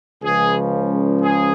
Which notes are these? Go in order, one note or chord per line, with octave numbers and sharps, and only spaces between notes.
C#2 C#3 F3 G#4
G#4